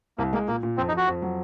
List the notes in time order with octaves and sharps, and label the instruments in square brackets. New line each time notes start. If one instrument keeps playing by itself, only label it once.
[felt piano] C2 [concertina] A#3
[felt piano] G#3 [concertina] A#3
[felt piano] A#2 [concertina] A#3
[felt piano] A#2
[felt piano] F2 [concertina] C4
[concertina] D#4
[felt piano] F2 [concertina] F#4
[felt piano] F2
F#3